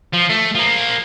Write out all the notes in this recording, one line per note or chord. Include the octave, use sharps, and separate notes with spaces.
F3
A3
F3 A#3